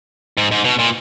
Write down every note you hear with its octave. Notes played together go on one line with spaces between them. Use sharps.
G#2
G#2
B2
A#2